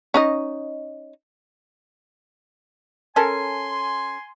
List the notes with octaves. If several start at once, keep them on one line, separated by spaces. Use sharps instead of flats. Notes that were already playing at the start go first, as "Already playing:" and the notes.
C#4 D#4 D#5
C#4 A4 A#4 G#5 C6